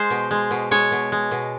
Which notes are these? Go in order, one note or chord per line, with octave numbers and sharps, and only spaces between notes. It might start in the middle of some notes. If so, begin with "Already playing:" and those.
Already playing: G#3 C5
B2
G#3
B2
G#3 C#5
B2
G#3
B2